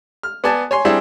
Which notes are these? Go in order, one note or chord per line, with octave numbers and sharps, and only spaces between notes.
F6
B3 D5 G#5 A5
C#5 G#5 C6
G3 C4 D4 E4 G#4